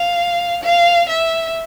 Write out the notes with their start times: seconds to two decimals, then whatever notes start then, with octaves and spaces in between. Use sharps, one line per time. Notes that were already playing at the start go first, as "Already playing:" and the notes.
Already playing: F5
0.64 F5
1.09 E5